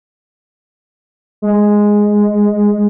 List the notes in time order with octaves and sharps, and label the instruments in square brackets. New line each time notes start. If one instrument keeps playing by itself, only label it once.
[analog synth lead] G#3